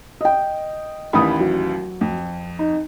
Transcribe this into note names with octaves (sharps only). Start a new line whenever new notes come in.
D#5 G5
A1 D#2 E3 B5 D#6
F#3
F2
D#4